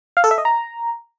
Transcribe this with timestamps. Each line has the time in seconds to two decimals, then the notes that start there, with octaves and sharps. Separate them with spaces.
0.17 F5
0.24 A4
0.31 E5
0.38 D#5
0.45 A#5